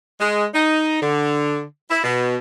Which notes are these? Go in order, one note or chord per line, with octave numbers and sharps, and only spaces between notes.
G#3
D#4
D3
E4
B2